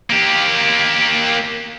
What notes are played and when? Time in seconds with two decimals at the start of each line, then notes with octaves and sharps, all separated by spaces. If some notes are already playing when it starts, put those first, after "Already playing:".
0.10 A#3 G4